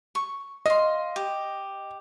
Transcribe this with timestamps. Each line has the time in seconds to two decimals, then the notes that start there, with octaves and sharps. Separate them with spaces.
0.15 C#6
0.66 D#5 F5 C6
1.16 G4